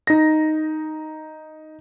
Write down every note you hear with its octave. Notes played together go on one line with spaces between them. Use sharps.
D#4 A#6